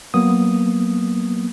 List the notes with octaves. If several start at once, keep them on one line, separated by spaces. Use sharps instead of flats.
F#3 A#3 B3 D#6